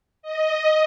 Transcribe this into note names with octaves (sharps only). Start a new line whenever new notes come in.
D#5